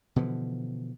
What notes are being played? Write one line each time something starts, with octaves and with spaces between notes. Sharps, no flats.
B2 D3 E3 F3